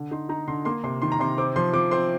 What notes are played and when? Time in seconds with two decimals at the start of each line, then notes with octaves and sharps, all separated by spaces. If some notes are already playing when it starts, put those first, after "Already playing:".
Already playing: D3
0.11 D#4 C6
0.29 D#4 A#5
0.48 D3 C6
0.65 A#3 C6
0.84 C3 C6
1.02 D#3 C6
1.12 A#5
1.20 C3 C6
1.38 C4 D6
1.56 F3 C6
1.73 F3 D6
1.91 C4 C6